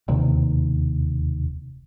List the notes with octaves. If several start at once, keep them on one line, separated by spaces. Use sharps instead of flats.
E1 D#2 C3 D#3